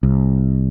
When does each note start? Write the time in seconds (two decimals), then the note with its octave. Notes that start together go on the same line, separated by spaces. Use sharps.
0.03 C2